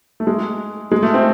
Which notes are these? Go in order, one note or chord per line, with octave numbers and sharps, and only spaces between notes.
A3
G#3
G#3
A3
C4